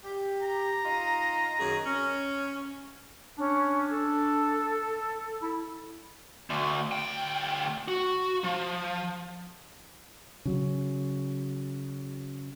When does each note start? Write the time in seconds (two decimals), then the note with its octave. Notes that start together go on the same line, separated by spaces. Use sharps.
0.04 G4
0.42 A#5
0.84 D#4 F4 D#5
1.59 F#2 D#3 G#4
1.85 C#4
3.38 C#4 D4
3.90 A4
5.42 E4
6.50 D2
6.92 D2 G5
7.88 F#4
8.44 F3
10.45 C#3 F#3